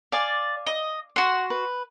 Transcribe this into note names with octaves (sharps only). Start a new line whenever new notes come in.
D5 F5 G#5 D6
D#5
F#4 F#5 C6
B4